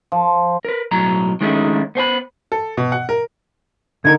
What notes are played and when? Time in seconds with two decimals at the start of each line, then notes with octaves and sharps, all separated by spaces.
0.12 F3
0.65 A#4 B4
0.91 B1 A2 F#3 A#5
1.41 D#3 G#3 A3 C#4 D#4 E4
1.95 B3 C5 G#5 B5
2.52 A4
2.77 B2
2.92 F#5
3.09 A#4
4.05 D3 D#4 A#4 G#6